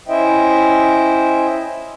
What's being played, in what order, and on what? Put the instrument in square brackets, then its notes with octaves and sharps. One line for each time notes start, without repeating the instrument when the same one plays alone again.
[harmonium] C#4 E4 C5 D#5 E5 G5